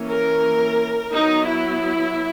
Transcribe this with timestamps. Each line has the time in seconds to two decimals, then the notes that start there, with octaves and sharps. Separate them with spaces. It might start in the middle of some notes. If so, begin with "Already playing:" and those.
Already playing: E3 A#3 C#4
0.10 A#4
1.12 F#3 B3 D#4
1.47 E4